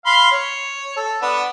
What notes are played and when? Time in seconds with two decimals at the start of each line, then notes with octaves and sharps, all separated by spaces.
0.06 F5 B5 C6
0.31 C#5
0.97 A4
1.22 B3 D4